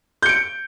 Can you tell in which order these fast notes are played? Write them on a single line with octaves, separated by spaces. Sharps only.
G6 C#7 D7